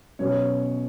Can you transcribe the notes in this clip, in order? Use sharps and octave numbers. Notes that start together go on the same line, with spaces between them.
B1 B2 F#3 C#4 C#5